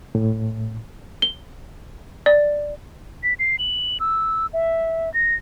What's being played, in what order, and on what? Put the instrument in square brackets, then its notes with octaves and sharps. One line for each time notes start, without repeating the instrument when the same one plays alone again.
[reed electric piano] A2
[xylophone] G7
D5
[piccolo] B6
C7
F#7
E6
E5
A#6